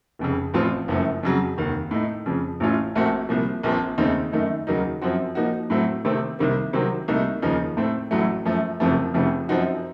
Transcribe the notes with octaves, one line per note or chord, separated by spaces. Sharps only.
F1 F2 C#3
A1 A2 F3 C4 F4
F#1 F#2 F3 A3
F2 C#3 F#3
F1 D#2 D#3
A2 A3 D#4
F2 C#3 F3
A1 A2 A3 C#4 F4
A#1 A#2 A3 C4 F#4
C2 A#2 F3
A#1 A#2 F3 C4
D#2 C#3 A3 C4 D#4
F#2 D#3 A3 D#4
D#2 C#3 F#3 A#3 D#4
F#2 F3 C4 F#4
A#2 F3 A#3 D#4 F#4
A2 F#3 A3 C4
C3 D#3 A3 C4
C2 C3 D#3 A#3
C3 D#3 F#3 C4
C2 A#2 A3 D#4
D#2 C#3 F3 A#3 D#4
A2 A3 C4
A1 A2 F#3 A3
F#2 F3 A3
F#1 F2 C3 F3 A3
F1 F2 C#3 F3 A3
F#2 F3 C4 D#4 F#4